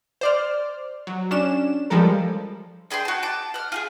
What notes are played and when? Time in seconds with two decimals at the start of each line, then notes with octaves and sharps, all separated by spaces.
0.21 C5 D5 F6
1.07 F#3
1.31 C#4 D4 E7
1.90 F3 G3 G#3 A4 A#4
2.90 D4 G#4 G5 C6
3.05 F#4 A5
3.23 A5 D6
3.54 F#5 F6
3.72 F4 G4 G#4